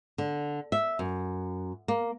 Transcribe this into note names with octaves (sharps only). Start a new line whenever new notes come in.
D3
E5
F#2
A#3